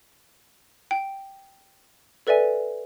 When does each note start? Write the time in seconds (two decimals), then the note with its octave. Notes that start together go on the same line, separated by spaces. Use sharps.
0.91 G5
2.27 A4 B4 D5 E5 G#5